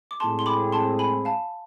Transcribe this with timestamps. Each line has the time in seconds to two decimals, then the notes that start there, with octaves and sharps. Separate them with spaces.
0.11 D6
0.20 A2 G#3 C4 G#4 A5 C6
0.39 C6
0.46 B5 D6
0.72 A5 C6
0.99 G#5 B5
1.25 F5 A5